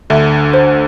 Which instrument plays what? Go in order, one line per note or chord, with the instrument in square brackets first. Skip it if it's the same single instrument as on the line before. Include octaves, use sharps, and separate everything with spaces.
[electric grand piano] D2 D3 [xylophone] E5
[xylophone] C5